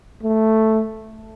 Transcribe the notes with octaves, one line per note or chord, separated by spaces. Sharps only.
A3